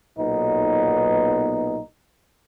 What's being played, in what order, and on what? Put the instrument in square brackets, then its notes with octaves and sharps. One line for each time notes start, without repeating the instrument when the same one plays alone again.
[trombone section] B1 A#2 B3 D#4